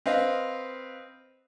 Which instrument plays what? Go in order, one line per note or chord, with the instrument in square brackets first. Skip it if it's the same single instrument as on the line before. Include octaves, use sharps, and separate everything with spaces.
[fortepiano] C4 B4 D#5 F5